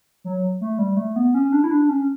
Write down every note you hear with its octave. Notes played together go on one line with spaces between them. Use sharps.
F#3
A3
G3
A3
B3
C#4
D4
E4
D4
C#4